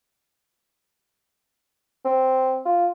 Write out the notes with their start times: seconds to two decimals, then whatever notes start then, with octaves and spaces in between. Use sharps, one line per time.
2.05 C4
2.66 F4